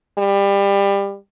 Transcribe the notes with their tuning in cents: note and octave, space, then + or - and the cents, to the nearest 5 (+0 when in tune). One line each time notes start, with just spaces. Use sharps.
G3 +25